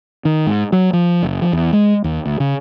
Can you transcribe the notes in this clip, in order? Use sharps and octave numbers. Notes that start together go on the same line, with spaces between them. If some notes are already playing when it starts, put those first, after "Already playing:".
D#3
G#2
F#3
F3
F#1
F3
E2
G#3
D#2
D2
C#3